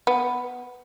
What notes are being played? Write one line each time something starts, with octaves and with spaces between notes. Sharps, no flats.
B3